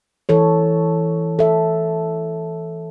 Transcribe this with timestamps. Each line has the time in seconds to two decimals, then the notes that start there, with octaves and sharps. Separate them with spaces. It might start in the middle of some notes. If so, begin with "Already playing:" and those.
0.29 E3 A4 C#5
1.39 A4 E5